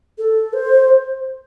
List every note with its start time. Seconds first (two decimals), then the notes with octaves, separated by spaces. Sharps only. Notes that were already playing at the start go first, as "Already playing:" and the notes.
0.18 A4
0.53 C5